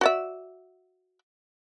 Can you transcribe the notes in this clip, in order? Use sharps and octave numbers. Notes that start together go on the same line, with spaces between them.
F#4 D5 E5